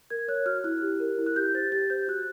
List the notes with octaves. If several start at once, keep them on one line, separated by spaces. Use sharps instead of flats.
A#4 G#6
C#5 F#6
F#4 F6
E4 F#6
G4
A#4
E4
F#6
G4 G6
C5 A6
G4 A6
C5 G6
F#4 F#6